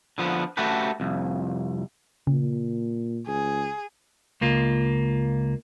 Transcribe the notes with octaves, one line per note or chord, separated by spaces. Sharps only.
D3 F3 B3
A3 C#4 F#4 G4 A4 B4
C2 F2
A#2 C#3
C#2 G#4
C#2 A#3 F4